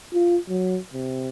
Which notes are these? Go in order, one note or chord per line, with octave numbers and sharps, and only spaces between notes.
F4
F#3
C3